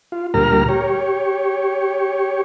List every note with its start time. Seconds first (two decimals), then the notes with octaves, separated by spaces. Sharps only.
0.12 F4
0.34 D2 A#2 G3 A#4 A#5 F6
0.69 G4 C#5